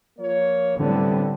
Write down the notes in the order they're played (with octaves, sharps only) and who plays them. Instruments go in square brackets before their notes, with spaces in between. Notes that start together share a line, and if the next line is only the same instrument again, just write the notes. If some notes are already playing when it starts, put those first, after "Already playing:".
[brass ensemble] F3 A#3 C#5
[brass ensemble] A2 B3 C4 [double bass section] D3 G3